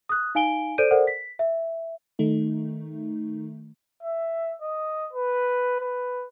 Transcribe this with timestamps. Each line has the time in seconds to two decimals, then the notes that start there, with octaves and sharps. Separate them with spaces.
0.09 D#6 F#6
0.35 D#4 F5 G#5 D7 G7
0.78 A4 C5 D5 G6 D7 D#7
0.91 A4 A#4 C5 D5 F#5
1.07 B6
1.39 E5
2.19 D#3 A3 D#4
4.03 E5
4.62 D#5
5.13 B4
5.81 B4